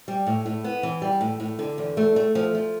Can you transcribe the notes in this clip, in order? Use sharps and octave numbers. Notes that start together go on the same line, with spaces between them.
G3
A2
A2
B3
E3
G3
A2
A2
D3
E2
A3
A3
F3
F3